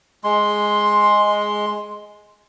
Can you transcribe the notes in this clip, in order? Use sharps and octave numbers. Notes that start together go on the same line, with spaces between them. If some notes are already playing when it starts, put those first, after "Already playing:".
G#3 C6